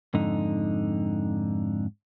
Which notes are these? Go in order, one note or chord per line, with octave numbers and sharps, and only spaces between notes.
F2 G#2 D3 D#4